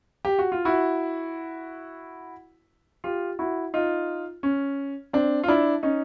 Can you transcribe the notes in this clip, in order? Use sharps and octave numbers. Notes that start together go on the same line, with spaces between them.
G4
F#4
F4
E4 F#4
F4 G4
E4 F#4
D#4 F4
C#4
C4 D4
F4
D4 E4
C#4 D#4